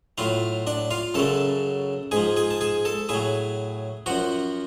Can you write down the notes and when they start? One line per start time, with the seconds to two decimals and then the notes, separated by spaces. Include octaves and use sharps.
0.18 A2 F#3 F4 F5
0.67 D4 D5
0.91 F4 F5
1.14 F#2 C#3 F#3 A4 A5
2.12 G#2 F3 G#4 G#5
2.36 G#4 G#5
2.51 A5
2.61 G#4 G#5
2.85 A4 A5
3.09 A2 F#3 G#4 G#5
4.06 F#2 F3 F#4 F#5